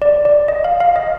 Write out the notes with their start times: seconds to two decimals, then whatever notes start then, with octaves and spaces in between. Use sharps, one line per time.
0.02 D5
0.25 D5
0.48 D#5
0.64 F5
0.80 F5
0.96 D#5